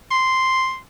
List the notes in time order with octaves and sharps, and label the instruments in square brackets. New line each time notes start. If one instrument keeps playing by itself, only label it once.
[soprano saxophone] C6